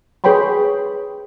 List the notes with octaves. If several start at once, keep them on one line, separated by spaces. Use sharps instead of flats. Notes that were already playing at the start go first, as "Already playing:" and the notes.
G#4 B4 C#5 G5 B5 C6